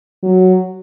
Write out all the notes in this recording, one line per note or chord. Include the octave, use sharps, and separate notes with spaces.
F#3